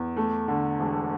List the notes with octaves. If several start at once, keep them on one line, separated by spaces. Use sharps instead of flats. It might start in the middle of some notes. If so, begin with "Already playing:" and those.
Already playing: E2
A3
D3
E1